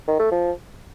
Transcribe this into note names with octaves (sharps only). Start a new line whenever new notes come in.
D#3
A3
F3